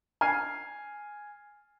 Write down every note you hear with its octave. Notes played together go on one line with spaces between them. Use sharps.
G#5 F6 C7 D#7